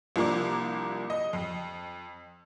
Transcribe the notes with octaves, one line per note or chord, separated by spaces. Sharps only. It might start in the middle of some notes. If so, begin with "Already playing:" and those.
C2 F3 A#3 D4 D6
D#5
F2